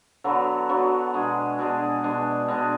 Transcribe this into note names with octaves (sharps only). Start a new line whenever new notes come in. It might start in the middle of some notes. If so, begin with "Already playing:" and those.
D3 F#3 B3 F#4
D3 F#3 B3 F#4
B2 G#3 D4 G#4
B2 G#3 D4 G#4
B2 G#3 D4 G#4
B2 G#3 D4 G#4